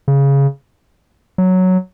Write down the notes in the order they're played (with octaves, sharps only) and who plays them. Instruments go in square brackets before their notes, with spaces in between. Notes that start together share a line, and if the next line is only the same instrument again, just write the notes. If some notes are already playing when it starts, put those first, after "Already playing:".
[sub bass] C#3
F#3